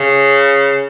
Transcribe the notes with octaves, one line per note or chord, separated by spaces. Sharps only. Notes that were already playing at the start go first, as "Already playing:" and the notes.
Already playing: C#3